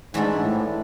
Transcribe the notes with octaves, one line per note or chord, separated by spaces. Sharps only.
G#2 E3 A3 D4 A4
A2